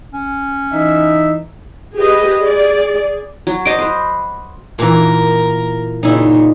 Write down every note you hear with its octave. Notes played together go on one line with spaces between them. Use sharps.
C#4
E3 D#4 E5
G4 G#4 B4 D#5
G#4 D5
F#3
C5 D#5 D6
B4 C5
A#2 E3 A#4
A#2 C#3 D#4 E4